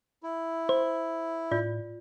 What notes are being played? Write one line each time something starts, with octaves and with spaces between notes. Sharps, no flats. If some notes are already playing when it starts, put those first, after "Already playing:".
E4
C5
A2 F4 D5